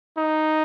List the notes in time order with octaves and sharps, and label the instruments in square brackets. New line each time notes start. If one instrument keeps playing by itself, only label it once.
[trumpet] D#4